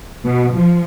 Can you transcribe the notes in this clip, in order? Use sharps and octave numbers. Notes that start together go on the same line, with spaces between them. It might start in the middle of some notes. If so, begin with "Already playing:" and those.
B2
F3